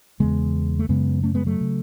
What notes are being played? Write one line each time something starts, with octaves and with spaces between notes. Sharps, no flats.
E2 C#3 G#3 B3
A3
F#2 C#3 G#3 B3
A3 C#4
G#3 B3
F#3 A3
C#3